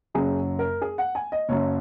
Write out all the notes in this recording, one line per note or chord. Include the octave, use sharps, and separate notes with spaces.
F#1 F#2 F#3 C#4 G#4
A#4
G#4
F#5
G#5
D#5
F#1 F#2 F#3 C#5